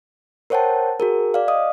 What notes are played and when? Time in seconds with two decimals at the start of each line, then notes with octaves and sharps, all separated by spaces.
0.50 A#4 C5 C#5 F#5 G5 A5
1.00 F#4 G#4 A#4
1.34 D5 F5
1.48 D#5 F5 D#6